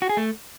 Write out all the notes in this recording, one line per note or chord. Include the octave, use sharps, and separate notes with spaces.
F#4
G#4
A3